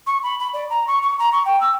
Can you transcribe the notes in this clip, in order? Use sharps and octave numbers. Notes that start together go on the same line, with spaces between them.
C#6
B5
B5
D5
A#5
C#6
C#6
A#5
C#6
G5
E6